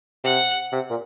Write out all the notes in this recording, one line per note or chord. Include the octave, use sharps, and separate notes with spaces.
C3 F#5
C3
A#2